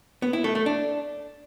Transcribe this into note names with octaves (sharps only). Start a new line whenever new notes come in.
B3
E4
A3
A3
D4